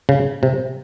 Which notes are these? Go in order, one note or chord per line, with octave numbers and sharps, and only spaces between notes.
C#3
C3